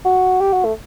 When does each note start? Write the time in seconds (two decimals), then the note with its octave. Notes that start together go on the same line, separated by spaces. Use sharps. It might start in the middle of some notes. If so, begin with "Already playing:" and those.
0.05 F#4
0.41 G4
0.53 F#4
0.65 A3